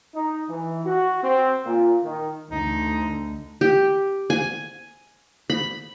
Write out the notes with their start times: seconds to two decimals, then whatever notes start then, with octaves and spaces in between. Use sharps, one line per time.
0.13 D#4
0.49 E3
0.84 F#4
1.23 C4
1.65 A#2
2.02 D#3
2.51 D2 D3 D#4
3.61 G4
4.30 G#5
5.50 B5